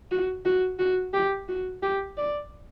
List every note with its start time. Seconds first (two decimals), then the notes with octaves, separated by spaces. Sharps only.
0.11 F#4
0.45 F#4
0.79 F#4
1.13 G4
1.49 F#4
1.83 G4
2.17 D5